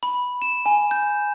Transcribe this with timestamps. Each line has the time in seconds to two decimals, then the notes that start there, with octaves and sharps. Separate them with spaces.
0.03 B5
0.42 E7
0.66 G#5
0.91 G6